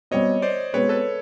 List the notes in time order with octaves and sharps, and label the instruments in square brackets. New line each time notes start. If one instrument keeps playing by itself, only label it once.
[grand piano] B2 G3 C4 [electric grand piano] C#5 D#5
[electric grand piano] C5 D5
[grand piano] B2 G#3 C4 [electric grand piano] B4 C#5
[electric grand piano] A4 B4